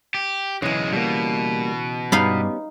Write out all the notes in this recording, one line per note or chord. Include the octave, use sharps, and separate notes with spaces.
G4
B1 C#3 E3 G#3
B2 G3 A#3
G2 G3 B3 C#4 D#4 F5 B5